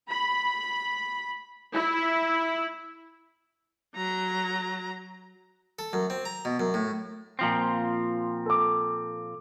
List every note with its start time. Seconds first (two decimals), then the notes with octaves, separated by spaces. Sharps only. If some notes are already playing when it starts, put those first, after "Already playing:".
0.10 B5
1.74 E4
3.96 F#3 A#5
5.79 A4
5.93 F#2
6.10 C4
6.25 A#5
6.45 B2
6.60 F#2
6.74 A2
7.39 A#2 F3 C4
8.46 A4 D6